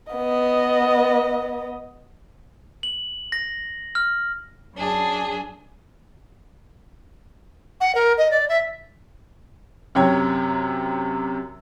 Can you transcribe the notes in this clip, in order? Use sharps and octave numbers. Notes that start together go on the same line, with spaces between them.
B3 D#5
F#7
A#6
F6
F#2 D4 G#4
F#5
A#4
D#5
D5
E5
F#2 C3 C#5 G5 G#6